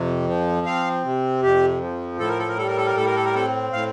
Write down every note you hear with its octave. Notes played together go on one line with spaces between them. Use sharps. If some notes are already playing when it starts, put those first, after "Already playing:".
Already playing: F2 C3
F3
C4 F5
C3
F2 G4
F3
A2 A4
A#4
A4
A#4
G3 A4
A#4
A4
A#4
A2 A4
A#4
A4
A#4
C4 A4
A2 F5